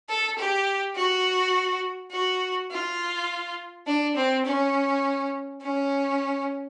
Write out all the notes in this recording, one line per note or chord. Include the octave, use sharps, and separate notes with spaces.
A4
G4
F#4
F#4
F4
D4
C4
C#4
C#4